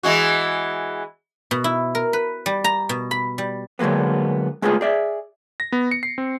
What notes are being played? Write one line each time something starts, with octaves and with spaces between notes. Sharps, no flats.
E3 G#3 F#4
B2
E4
A#4
B4
G3
A#5
B2
B5
G3
D3 F#3 G#3 A#3 B3
G#3 A3 B3 F4 G#4
G#4 D5 E5
A#6
B3
C#7
C7
C4